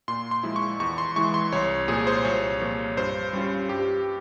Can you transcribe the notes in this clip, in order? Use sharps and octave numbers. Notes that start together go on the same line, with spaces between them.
A#2 C6
C6
F3 G#3 E4
C#6
E2 C#6
C6
E3 G#3 E4 C#6
C6
C2 C#5
A#2 F3 G#4
C5
C2 C#5
A#2 F3
G2 C5
G3 C#4 F4
G2 G4